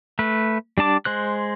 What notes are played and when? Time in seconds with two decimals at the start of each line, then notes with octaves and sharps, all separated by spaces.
0.19 A3 B4
0.78 G3 D4 A5 D6
1.05 G#3 C5 F#6